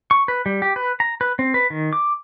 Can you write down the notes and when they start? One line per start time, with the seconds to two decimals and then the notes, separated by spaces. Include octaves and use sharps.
0.11 C#6
0.28 B4
0.46 G3
0.62 G4
0.76 B4
1.00 A#5
1.21 B4
1.39 C4
1.54 B4
1.70 D#3
1.93 D6